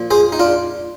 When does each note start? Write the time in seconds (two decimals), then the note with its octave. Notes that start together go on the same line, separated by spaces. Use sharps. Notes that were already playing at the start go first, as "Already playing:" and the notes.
Already playing: A#2 F3
0.11 G#4 C5
0.32 D#4
0.39 D4 F4